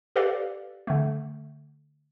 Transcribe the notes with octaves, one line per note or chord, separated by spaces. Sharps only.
G4 A4 B4 D5 F5
D3 A3